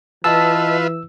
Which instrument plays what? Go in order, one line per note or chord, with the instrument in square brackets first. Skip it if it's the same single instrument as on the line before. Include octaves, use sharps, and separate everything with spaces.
[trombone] E3 [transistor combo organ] F4 B4 E5 [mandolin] D#5 A5 [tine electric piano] E6